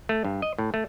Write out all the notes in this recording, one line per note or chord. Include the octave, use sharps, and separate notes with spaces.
A3
G2
D#5
A2
A3